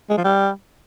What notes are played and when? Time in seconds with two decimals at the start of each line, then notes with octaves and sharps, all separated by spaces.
0.10 G#3
0.17 F3
0.24 G3